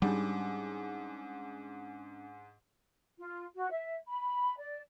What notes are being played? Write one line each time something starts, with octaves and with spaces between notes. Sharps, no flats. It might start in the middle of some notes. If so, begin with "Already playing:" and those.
G#2 G3 C#4 D4 D6
F4
F#4
E5
B5
D5